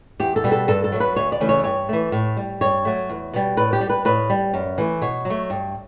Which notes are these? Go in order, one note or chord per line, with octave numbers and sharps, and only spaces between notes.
E2 G4
A4
B2 G3
A4
G2 A4
A4
F#3 A3
B4
D2 C#5
D5
C#3 E3 A3
C#5
G2 C#5
E3 A3
A2
G3
G2 C#5
F#3 A3
E2
B2 G3
A2 B4
G4
G3
B4
A2 B4
G3
F#2
E3 A3
B2 C#5
F#3
A3
G2